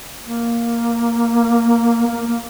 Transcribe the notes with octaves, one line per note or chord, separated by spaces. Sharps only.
A#3
A#3
A#3